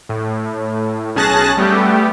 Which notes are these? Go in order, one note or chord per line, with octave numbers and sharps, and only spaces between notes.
A2
B1 C#4 G#4 A5 F#6 A#6
G3 A3 B3 G4